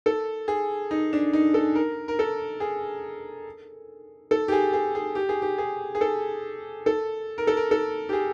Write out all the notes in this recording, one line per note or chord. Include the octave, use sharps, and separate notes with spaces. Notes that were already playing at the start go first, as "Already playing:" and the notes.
A4
G#4
D#4
D4
D#4
A4
A#4
A#4
A4
G#4
A4
G4
G#4
G#4
G#4
G4
G#4
G4
G#4
G#4
A4
A4
A#4
A4
A#4
A4
G4
G#4